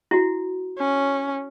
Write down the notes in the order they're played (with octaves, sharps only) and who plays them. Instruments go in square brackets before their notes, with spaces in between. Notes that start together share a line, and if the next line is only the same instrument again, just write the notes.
[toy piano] E4 F#4
[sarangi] C#4